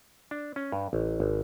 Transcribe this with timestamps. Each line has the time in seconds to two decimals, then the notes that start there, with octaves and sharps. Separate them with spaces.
0.31 D4
0.56 C#4
0.72 G2
0.93 A1
1.20 G#1